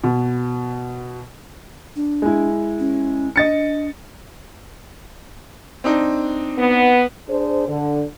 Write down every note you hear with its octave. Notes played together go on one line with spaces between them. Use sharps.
B2
D4
G#3 E4
C#4
D4 D#5 A6 C#7
C4 D4 D#4
B3
D4 G#4 C5
D3